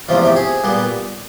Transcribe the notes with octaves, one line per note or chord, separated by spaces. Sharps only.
E2 C3 F3 A3 F4
G4
G#4
A#2 G3 B3